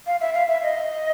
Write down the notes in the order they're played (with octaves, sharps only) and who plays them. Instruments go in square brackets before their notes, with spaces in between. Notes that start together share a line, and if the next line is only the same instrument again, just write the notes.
[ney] F5
E5
F5
E5
D#5